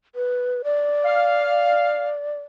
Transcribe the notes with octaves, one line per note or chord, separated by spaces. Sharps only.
B4
D5
F5